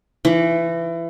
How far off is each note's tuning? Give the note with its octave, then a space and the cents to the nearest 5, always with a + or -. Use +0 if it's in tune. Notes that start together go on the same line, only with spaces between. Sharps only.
E3 +25